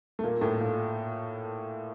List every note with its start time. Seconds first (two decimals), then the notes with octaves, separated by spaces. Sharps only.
0.19 A3
0.23 A#2 A#3
0.41 A2 A3
0.60 A#2 A#3